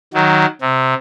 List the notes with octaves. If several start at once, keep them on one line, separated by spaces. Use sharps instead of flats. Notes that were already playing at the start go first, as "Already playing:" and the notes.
D#3 F#3
C3